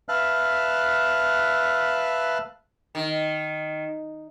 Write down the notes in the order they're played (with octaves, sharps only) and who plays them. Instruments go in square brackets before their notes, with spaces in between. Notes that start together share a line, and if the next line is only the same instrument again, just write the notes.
[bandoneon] B4 E5 F5 A5 F6 F#6
[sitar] D#3